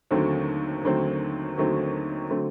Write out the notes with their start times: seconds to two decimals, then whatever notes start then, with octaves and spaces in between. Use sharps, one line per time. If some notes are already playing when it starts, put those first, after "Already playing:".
0.11 D#2 D3 F#3 A3 C4
0.84 D#2 D3 F#3 A3 C4
1.58 D#2 D3 F#3 A3 C4
2.30 D3 F#3 A3 C4